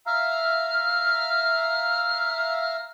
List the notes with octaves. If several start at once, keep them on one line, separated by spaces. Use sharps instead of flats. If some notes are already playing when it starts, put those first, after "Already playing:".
E5 F5 A#5 F6